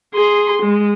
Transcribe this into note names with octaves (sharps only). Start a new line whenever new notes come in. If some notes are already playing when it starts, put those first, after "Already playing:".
G#4 C6
G#3